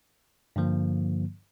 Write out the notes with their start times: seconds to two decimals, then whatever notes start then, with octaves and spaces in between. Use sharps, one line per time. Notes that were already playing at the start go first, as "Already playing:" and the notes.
0.56 G2 D3 F3 A#3